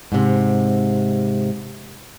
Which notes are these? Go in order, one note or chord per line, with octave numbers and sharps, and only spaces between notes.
G#2 C3